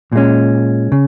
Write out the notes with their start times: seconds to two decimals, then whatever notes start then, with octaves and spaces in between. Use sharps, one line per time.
0.12 A#2 G#3 C#4
0.92 C#3